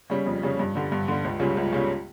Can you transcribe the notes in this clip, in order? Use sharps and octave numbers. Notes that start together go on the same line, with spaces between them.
C#3 G3 C#4
F2
C#3 G3 C#4
G2
D3 G3
G2
D3 G3
C#2
C#3 G3 C#4 F4
C#2
C#3 G3 C#4 F4